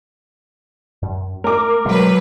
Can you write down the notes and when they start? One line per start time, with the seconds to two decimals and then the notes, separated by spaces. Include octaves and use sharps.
1.02 F#2
1.44 A3 A#4 D6
1.85 B2 F#3 G#3 A#3 B4